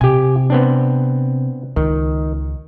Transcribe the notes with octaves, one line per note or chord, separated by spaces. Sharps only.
C3 G4 G#5
B3 C4 D4
C#2 D#3